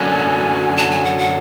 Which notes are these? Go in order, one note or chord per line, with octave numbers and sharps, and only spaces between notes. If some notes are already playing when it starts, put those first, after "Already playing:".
Already playing: F#2 D3 F#3 G#5
A5
G#5
F#5
F#5